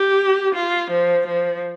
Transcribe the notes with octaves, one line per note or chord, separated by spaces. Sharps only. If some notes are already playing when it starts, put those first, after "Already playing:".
Already playing: G4
F4
F3
F3